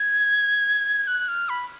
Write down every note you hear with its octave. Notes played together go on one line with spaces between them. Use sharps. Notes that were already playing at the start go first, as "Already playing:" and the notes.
Already playing: G#6
F#6
F6
B5